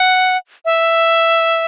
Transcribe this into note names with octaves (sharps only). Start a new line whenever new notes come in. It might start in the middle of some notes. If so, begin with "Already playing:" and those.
Already playing: F#5
E5